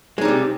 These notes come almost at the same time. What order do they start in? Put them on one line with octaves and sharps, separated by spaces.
G#3 D#4 G3 C3